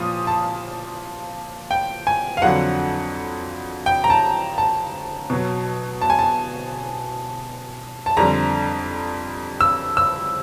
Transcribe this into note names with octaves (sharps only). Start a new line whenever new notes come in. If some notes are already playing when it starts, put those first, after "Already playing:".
Already playing: A#2 F3 D#6
A5
G5
G#5
F5
F2 D3 F#3 F#5
G5
A#5
A5
A5
B2 F#3
A5
G#5
A5
A5
F2 D3 G3 A#5
E6
E6